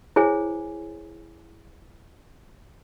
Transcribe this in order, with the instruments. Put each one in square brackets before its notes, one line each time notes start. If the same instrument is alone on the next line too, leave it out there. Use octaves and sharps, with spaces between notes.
[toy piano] E4 G#4 C5 C#5 G#5